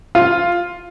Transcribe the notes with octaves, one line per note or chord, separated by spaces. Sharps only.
F4